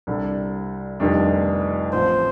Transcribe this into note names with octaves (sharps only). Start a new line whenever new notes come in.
C2 C3 G3 D4 A4
F1 F2 D#3 G3 D4
A1 A2 F3 C4 C5